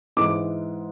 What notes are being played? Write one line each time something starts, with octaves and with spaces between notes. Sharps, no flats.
G#2 E3 G#3 D6